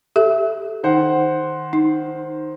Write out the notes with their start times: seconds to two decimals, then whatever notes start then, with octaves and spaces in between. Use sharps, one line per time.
0.16 G4 A4 E5
0.83 D#3 C5 F#5
1.73 D#4